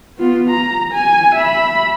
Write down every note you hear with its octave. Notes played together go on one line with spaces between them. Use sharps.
B3 F4
A#5
G#5
E5 B5